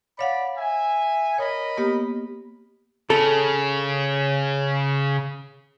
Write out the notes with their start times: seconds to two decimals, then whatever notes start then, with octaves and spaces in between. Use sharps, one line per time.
0.19 C#5 D5 F5 F#5 B5
0.58 E5 G#5
1.38 A#4 C#5 D#5 B5
1.77 A#3 B3 G4
3.10 C#3 A4